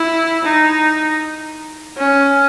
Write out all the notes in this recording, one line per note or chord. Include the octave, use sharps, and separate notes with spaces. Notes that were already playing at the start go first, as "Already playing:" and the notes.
Already playing: E4
D#4
C#4